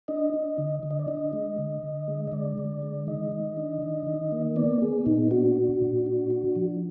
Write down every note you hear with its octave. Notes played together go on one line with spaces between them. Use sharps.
D4 D#5
D4
D3
D3
D#5
D5
D4 D#5
G#3
D3
D3
G#3
D#5
D3 D5
D3
G#3
D#3 D#5
D#3
D4
D#3
D#3
A#3
B3 D5
B3 G#4
A#2 D#4
D4 F#4
D4
A#2
D4
D4
F3